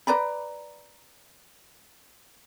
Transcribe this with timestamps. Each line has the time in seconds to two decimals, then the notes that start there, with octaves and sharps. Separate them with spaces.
0.07 B4 D5 A#5 B5